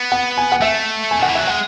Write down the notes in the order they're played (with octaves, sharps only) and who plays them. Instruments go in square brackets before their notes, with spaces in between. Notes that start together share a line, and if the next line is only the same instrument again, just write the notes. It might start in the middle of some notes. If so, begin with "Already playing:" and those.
Already playing: [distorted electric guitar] B3
[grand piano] F#5
G#5
F#5
[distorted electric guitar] A3 [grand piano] E5
[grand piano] G#5
[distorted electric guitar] D#3 [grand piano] F#5
[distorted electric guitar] E3
[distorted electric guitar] F#3 [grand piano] E5
[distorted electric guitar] G#3 [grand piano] F#5